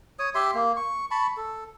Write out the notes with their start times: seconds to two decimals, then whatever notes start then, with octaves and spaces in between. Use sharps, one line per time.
0.19 C#5 D#6
0.35 G4 E5 C6
0.54 A#3
0.77 C#6
1.11 A5 B5 C#6
1.37 A4